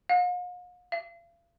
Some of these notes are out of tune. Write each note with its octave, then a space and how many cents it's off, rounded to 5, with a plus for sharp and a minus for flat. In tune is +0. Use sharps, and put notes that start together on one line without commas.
F5 +45
F5 -40